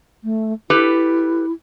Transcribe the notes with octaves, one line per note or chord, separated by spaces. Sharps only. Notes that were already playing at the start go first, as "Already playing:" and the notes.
A3
E4 G4 A4 B4